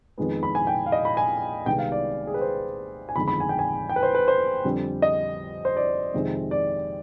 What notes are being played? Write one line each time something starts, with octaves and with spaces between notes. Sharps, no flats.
F2 D#3 G#3 B3
B5
G#5
G5
F5
D#5
B5
G#5
C2 C3 D#3 G#3 B3 G5
F5
D5
G#4
B4
C5
G#5
G1 F2 D#3 G#3 B5
B5
G#5
G5
G#5
G5
B4
C5
B4
C5
F2 D3 G3 C4
D#5
C5
D5
F2 C3 D#3 G#3 C4
D5